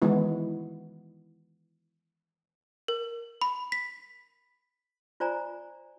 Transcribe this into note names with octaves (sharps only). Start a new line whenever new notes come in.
D#3 E3 G#3 B3 E4
A#4
B5
B6
F4 C5 D5 G#5 A#5